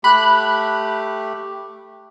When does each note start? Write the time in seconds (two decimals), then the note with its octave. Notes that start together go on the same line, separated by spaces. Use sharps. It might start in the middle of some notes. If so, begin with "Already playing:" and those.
0.04 A3 G4 B5 F#6